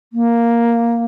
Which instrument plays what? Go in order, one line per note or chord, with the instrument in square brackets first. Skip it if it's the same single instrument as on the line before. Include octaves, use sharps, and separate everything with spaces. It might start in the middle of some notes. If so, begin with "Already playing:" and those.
[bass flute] A#3